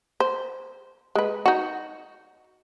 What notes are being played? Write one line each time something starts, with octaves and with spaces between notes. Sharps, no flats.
C5
G#3 B4
D#4 F#4